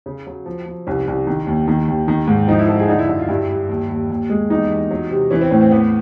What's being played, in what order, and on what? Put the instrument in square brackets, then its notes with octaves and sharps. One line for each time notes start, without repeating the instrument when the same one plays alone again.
[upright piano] C#3
F#3
F3
F3
C2 C#4
C2
D#3
D#2
D#3
D#2
D#3
G#2
F3 D#4
E4
F3 A4
G#4
D3 D#4
E4
F#2
F4
G2 E4
G3
D#2
D#2
D#2
G#3
E2 D#4
E2
F#3
C3
E3 C#4
C4
A2 C#4
C4
E2 B3